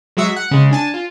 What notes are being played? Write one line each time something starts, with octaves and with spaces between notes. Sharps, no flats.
F#3 G#3 F#4 E5
F#5
C#3 G#3
D4 G#5 A5
F4